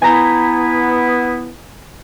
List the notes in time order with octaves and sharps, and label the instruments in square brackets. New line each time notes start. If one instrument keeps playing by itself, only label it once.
[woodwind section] B3 E4 [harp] G#5 A#5 G6